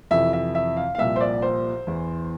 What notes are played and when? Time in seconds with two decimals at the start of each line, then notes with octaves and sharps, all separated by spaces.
0.11 F2 C3 E3 E5
0.33 E5
0.55 E5
0.77 F5
0.95 F5
0.98 C2 A#2 F3 E5
1.16 C5
1.21 D5
1.42 C5
1.87 E2 E3